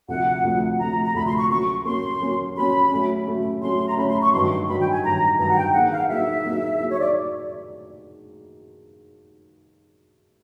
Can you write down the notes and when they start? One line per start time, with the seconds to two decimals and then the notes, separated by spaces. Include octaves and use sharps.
0.08 D2 C3 F3 A3 F#5
0.43 D2 C3 F3 A3
0.79 D2 C3 F3 A3 A#5
1.04 A#5
1.14 D2 C3 F3 A3 B5
1.26 C6
1.38 C#6
1.50 F#3 A#3 C#4 C#6
1.85 F#3 A#3 C#4 C6
2.20 F#3 A#3 C#4
2.56 F#3 A#3 C#4 B5
2.91 F#3 A3 C#4
3.26 F#3 A3 C#4
3.62 F#3 A3 C#4 C6
3.88 A#5
3.97 F#3 A3 C#4 B5
4.09 C6
4.21 C#6
4.32 G2 D#3 F#3 C6
4.68 G2 D#3 F#3 B5
4.80 G5
4.92 G#5
5.03 G2 D#3 F#3 A#5
5.39 G2 D#3 F#3 A#5
5.50 F#5
5.56 G5
5.73 F#3 A#3 D#4 G#4 F#5
5.92 F5
6.09 F#3 A#3 D#4 G#4 E5
6.45 F#3 A#3 D#4 G#4
6.80 F#3 A#3 D#4 G#4
6.90 C#5
6.99 D5